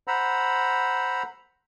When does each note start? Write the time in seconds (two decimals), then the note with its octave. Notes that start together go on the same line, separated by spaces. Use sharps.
0.08 C5 F#5 A#5 B5 E6